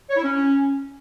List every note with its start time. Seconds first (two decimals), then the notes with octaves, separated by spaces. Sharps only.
0.10 C#5
0.17 E4
0.23 C#4